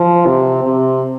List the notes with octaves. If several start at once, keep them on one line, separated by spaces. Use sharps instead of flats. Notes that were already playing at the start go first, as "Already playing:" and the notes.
Already playing: F3
C3
C3